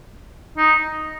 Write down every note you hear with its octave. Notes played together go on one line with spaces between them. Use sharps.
D#4